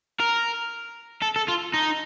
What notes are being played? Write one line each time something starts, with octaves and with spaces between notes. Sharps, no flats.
A#4
A4
A4
F4
D#4